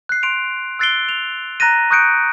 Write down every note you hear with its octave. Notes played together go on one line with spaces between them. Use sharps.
F#6 C7
C6 D7 F7
E6 F#6 A6 C7 D7 G7
F7
A#5 F#6 A6 A#6 D#7
C#6 D#6 F#6 G6 C#7 D7